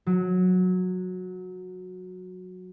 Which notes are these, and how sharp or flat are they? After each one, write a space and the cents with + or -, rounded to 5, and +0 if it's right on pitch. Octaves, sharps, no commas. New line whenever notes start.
F#3 -15